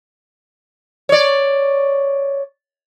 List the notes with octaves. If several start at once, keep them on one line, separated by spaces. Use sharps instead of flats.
C#5 D5